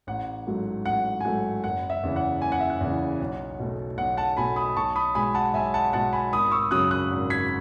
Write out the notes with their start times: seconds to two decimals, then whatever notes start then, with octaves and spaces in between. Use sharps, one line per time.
0.07 A1 F#5
0.47 G#2 F#3 A3
0.86 A1 F#5
1.21 G#5
1.25 G#2 F#3 A3 F#5
1.64 F#1 F#5
1.90 E5
2.03 E2 C#3 E3
2.16 F#5
2.42 F#1 G#5
2.52 F#5
2.61 E5
2.70 F#5
2.81 E2 C#3 E3
3.20 B1
3.59 B2 A3
3.98 B1 F#5
4.17 F#5 A5
4.37 B2 A3 G#5 B5
4.56 B5 D#6
4.76 B1 A5 C#6
4.96 B5 D#6
5.15 B2 G#3 G#5 B5
5.35 F#5 A5
5.54 B1 E5 G#5
5.74 F#5 A5
5.93 B2 G#3 F#5 A5
6.13 G#5 B5
6.33 G#1 B5 D#6
6.51 C#6 E6
6.71 F#2 C#3 F#3 D#6 F#6
6.91 D#6 F#6
7.11 G#1
7.30 G#6 B6